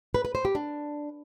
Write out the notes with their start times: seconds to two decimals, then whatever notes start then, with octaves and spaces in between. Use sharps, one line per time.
0.14 B4
0.25 B4
0.35 C5
0.45 G4
0.55 D4